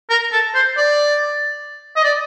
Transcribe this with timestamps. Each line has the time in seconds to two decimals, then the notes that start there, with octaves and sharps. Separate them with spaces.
0.10 A#4
0.32 A4
0.55 C5
0.78 D5
1.96 D#5
2.04 D5